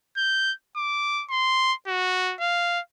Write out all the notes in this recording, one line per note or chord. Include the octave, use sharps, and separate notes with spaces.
G6
D6
C6
F#4
F5